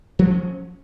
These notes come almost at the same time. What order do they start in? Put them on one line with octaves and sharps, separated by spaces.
F3 B3 F#3 C#4